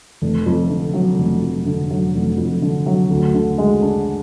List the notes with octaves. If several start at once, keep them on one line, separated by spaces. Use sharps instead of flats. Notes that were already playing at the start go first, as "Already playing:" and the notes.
F1
F2
D3
F#3
F1
F2
D3
F#3
F1
F2
D3
F#3
D2
D3
G#3
D4